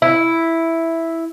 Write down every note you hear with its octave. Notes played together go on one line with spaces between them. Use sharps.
E4